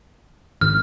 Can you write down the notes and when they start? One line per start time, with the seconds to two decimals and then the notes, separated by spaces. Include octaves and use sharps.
0.61 G#1 F6